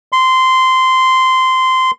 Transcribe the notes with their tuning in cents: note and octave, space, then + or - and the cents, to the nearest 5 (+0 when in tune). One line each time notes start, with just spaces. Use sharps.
C6 -15